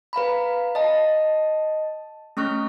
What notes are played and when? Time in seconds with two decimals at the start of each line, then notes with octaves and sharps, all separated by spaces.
0.13 B4 F5 A#5 B5
0.75 D#5 A5
2.37 A3 C#4 C#6 F6 F#6 A#6